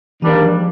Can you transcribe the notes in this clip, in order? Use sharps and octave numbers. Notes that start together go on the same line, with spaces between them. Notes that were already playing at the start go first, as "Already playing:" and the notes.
G#2 D#3 E3 G3 A#3 D4
F3